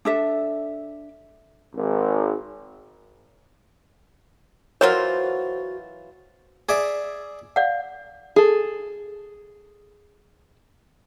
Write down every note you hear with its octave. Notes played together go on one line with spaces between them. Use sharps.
D4 A4 E5
G#1
E3 F#3 F4 F#4 A#4 C5 C#5
G#4 D5 E5
D5 F5 F#5
G#4 A4